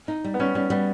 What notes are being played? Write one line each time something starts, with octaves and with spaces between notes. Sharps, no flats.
D#4
G3
B3
G3 C#4
G3 C#4
G3 B3